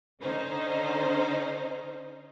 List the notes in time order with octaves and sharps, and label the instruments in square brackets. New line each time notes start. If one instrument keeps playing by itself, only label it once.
[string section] D3 C#4 D#4 C5